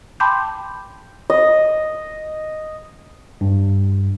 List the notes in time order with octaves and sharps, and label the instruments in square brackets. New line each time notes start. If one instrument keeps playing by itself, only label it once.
[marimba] G5 A5 B5 C6 D6 G6
[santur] D#5
[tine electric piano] G2